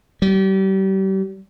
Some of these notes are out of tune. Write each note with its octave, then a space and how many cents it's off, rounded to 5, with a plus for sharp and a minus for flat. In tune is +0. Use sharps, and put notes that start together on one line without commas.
G3 -35